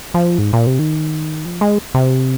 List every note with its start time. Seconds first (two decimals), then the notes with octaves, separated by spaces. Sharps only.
0.14 F3
0.38 G#2
0.53 A#2
0.67 C3
0.79 D#3
1.45 F3
1.61 G#3
1.94 C3